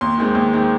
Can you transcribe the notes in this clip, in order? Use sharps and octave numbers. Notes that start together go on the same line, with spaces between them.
D#2 C6
D#3 G#3 C4
D#2
D#3 G#3 C4